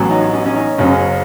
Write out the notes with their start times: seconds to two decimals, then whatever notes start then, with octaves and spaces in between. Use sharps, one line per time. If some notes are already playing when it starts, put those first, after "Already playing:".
Already playing: A1 A2 F#3 A3 B3 C#4
0.10 D#4
0.33 C#4
0.46 C#4
0.56 D#4
0.78 F#1 F#2 C#3 C#4